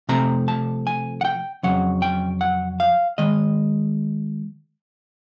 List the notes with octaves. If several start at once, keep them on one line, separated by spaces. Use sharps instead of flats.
C3 F3 A3 C4 A#5
A5
G#5
F#5
G5
F2 C#3 F#3 F#5
G5
F#5
F5
D#3 G#3 D#5